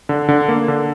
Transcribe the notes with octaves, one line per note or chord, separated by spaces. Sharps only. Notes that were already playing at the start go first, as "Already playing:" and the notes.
D3
D3
A#3
D3